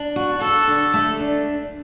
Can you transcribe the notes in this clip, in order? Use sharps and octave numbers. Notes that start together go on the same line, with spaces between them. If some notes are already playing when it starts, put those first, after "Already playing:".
Already playing: D4
F#4
F#4 A4
D3
A3
D4